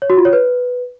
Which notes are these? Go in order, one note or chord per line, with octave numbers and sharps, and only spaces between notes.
C#5
F#4
F4
C#5
B4